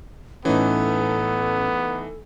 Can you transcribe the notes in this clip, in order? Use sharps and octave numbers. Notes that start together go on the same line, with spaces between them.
A2 E3 A3 B3 C#4 D#4 A4